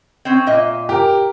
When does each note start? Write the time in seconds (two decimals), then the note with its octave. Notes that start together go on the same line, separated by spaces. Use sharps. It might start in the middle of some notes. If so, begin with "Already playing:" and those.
0.25 C4 C#4
0.47 A#2 D#5 E5
0.89 G4 A#4